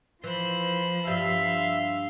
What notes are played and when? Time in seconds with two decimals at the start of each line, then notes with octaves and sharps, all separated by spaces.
0.24 E3 F3 C5 B5
1.07 G2 G3 E5 F5 C6